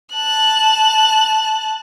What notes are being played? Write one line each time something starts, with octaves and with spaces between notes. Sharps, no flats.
A5 F#6